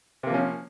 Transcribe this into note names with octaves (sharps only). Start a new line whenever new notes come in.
C3 F3 A#3 C#4